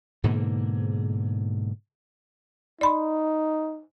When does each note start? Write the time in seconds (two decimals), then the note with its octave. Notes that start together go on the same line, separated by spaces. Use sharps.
0.24 G#2 B2 D3 A#3
2.81 D#4 D5 B5 C6